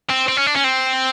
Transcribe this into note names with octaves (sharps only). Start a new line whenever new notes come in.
C4
C4
C#4
D4
C#4
C4